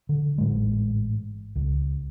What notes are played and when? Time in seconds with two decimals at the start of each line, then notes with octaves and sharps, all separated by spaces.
0.09 D3
0.38 A1 G#2 G#3
1.56 C#2